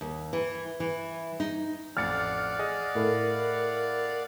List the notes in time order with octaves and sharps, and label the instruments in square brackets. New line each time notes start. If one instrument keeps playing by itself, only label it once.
[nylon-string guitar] D#2
E3
E3
D#4
[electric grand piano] A1 F2 [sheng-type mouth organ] D5 F5 F#5 [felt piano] F6 A6 C#7
[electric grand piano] G#4 D#5 D#6
[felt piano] A2 A4 [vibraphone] A#4